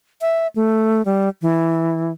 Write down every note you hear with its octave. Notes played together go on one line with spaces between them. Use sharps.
E5
A3
G3
E3